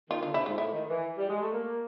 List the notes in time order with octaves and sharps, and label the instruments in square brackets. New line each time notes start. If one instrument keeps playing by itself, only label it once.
[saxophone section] D#3 [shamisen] F4
[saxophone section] D3 [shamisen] F4
[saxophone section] C3 [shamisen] E4
[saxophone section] G#2 [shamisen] F4
[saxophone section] A2 [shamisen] E4
[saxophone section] D#3
E3
G3
G#3
A3
A#3